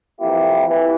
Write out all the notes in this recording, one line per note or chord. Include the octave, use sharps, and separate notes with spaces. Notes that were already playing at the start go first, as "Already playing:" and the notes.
F2 E3 A#3 E4 G4
E3